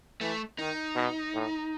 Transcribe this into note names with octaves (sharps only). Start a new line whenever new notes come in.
E3 A3
D#3 D#4
B2
A2